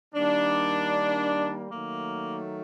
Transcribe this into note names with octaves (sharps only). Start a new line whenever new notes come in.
D#3 G3 A#3 D4
D#3 F#3 A3 A#3